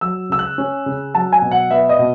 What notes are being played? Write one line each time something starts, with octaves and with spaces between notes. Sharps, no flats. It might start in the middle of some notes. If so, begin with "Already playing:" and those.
F#3 E6
C#3 E6
F#6
C#4
C#3
F#3 A5
G#5
B2
F#5
B3 E5
D#5
B2